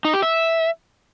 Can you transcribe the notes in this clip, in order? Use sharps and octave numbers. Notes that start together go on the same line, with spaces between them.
D#4
G4
E5